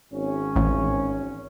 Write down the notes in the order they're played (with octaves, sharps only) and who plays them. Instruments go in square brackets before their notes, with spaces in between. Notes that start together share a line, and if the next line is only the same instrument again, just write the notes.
[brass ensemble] G#1 C#4
[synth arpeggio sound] A1